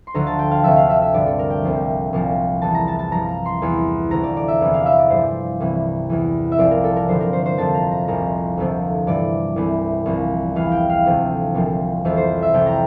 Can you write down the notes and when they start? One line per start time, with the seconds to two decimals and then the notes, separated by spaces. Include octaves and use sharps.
0.07 C6
0.14 D2 D3 F3 A#5
0.27 A5
0.39 G5
0.51 F5
0.64 D2 C3 F3 E5
0.76 F5
0.89 E5
1.01 E5
1.14 G2 D3 F3 D5
1.26 A4
1.39 A#4
1.50 G5
1.63 C2 C3 F3
2.13 C2 A#2 F3
2.62 E2 E3 A5
2.75 A#5
2.88 A5
2.99 A5
3.12 G2 F3 A#5
3.29 A#5
3.46 C6
3.62 E2 E3
4.11 D2 C3 F3 A#5
4.23 D5
4.36 D5
4.48 E5
4.61 E2 C3 E3
4.74 F5
4.86 E5
4.98 D5
5.10 G2 F3 C5
5.60 C2 C3 E3
6.09 E2 E3
6.52 E5
6.58 C2 A#2 F3 D5
6.71 A#4
6.84 A4
6.96 A#4
7.08 G2 D3 F3 C5
7.20 A#4
7.33 C5
7.46 C5
7.58 F2 C3 F3 A5
7.74 A#5
7.91 A#5
8.08 C2 A#2 F3 A#5
8.58 D2 C3 F3
9.07 G2 E3 D5
9.56 C2 C3 E3
10.06 C2 A#2 F3
10.56 E2 E3 F5
10.72 G5
10.89 F5
11.06 D2 C3 F3
11.54 C2 A#2 F3
12.04 F2 C3 E3 E5
12.17 C5
12.42 E5
12.54 F2 C3 E3 G5
12.66 A#5